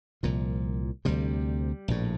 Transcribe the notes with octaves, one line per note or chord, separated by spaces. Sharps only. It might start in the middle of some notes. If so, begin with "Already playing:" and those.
C2 A#2 F3
D2 C3 G3
A#1 A2